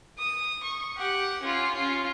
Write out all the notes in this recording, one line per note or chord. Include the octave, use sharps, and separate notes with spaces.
D#6
C#6
G4 F#5
C#4 F4
C#4 F4